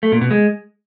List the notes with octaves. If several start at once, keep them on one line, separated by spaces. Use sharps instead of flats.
A3
A#2
B2
G#3